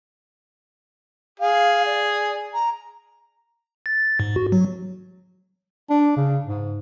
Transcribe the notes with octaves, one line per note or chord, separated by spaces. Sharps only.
G#4 F5
D5
A#5
A6
G#2
F#4
F#3
D4
C#3
G#2